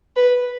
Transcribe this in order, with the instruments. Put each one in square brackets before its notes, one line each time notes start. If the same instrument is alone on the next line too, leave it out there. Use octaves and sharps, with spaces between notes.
[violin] B4